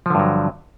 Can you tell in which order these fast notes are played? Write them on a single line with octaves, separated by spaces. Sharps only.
F3 D3 G2 F#3